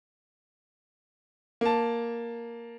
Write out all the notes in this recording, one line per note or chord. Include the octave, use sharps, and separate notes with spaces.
A#3 A5